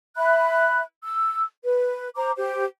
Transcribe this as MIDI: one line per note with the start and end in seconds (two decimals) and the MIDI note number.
0.17 0.81 76
0.17 0.81 83
0.17 0.81 90
1.03 1.43 88
1.64 2.08 71
2.16 2.31 72
2.16 2.31 82
2.16 2.31 86
2.38 2.64 67
2.38 2.64 72